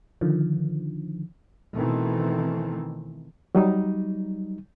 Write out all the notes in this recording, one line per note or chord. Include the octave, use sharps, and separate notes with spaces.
D3 D#3 F3
B2 D#3 E3 A3 C4
F#3 G3 D#4